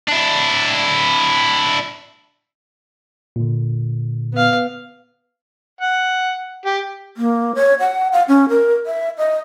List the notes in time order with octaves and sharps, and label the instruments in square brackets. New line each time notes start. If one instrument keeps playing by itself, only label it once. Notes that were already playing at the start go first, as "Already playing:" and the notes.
[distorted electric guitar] D4 E4
[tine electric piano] A#2 D3
[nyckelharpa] B3 F5
[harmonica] F#5
G4
[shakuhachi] A#3
C#5
F#5
F5
C#4
A#4
E5
D#5